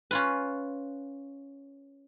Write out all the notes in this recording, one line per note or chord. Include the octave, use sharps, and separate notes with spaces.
C#4 F4 B4